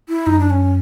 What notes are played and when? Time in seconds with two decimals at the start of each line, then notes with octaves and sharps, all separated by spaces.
0.09 E4
0.26 F#2 D#4
0.39 D4
0.50 C#4